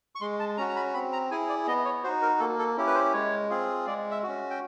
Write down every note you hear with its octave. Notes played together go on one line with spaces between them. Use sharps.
C#6
G#3 C6
A5
C#4 F#4 A#5
A#5
B5
C4 B5
A#5
E4 G#4 G#5
D5
B3 D#5
C#5
D#4 F#4 C5
A#4
A#3 A4
A4
C#4 E4 G4
B4
C5
G#3 C#5
C4 F4 G#4
G#3 D5
E5
C#4 F#4
G5